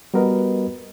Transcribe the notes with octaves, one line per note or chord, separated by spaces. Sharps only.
G3 B3 F#4 A#4 B4 D#5